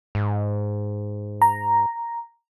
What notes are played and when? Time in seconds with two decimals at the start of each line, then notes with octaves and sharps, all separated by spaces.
0.15 G#2
1.42 A#5